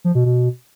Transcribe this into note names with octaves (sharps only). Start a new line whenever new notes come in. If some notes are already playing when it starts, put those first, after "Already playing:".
F3
B2
B2